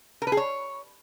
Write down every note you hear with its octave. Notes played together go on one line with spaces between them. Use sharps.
A#4
B4
G#4
C#5